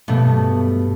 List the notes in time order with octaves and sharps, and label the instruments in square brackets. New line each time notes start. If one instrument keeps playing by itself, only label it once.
[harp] G2 A3 [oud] B2